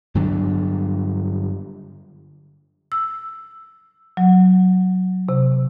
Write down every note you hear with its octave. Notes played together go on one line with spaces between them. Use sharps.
G2 D3 F#3 D4
E6
F#3
C3